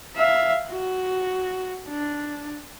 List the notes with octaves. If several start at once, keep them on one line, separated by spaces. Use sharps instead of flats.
E5 F5
F#4
D4